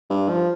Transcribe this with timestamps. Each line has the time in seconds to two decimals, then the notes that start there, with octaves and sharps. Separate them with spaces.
0.10 G2
0.29 F3